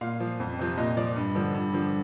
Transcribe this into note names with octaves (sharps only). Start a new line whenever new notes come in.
A#2 F5
F3
F2
C3 F3
A#2 D#5
F3 D5
G2
D3 F3
G2
D3 F3